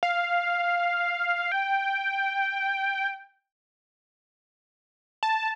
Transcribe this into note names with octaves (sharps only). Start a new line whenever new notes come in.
F5
G5
A5